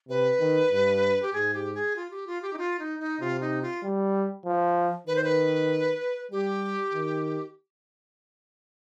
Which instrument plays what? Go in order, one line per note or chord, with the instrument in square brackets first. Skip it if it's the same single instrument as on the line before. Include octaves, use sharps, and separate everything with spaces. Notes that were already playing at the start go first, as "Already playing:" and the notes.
[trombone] C3 [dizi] B4
[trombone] D#3
G2
[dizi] G4
[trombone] G#2 [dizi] G#4
[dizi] G4
G#4
F4
G4
F4
G4
D#4
F4
D#4
D#4
[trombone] C3 [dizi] F4
[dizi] D#4
F4
[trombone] G3
F3
[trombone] D#3 [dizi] B4
[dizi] C5
B4
[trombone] G3 [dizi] G4
[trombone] D#3